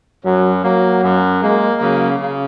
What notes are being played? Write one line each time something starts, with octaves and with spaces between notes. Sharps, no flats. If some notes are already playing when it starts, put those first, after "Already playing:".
F#2 F#3
F#3 A#3
F#2
G#3 A#3
C#3 F#3
C#3